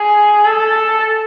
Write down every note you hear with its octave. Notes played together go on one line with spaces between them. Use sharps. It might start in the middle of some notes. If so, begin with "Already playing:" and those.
Already playing: G#4
A4